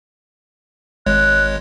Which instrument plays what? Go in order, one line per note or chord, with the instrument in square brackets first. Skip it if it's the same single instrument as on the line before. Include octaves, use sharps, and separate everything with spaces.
[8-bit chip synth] G#1 G#3 C#5 [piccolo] F#6